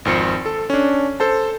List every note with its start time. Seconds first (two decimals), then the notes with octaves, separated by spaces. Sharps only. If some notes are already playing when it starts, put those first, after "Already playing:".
0.05 G#1 F2 C4 C#7
0.46 A4
0.70 C#4 D4
1.20 A4 C5 A5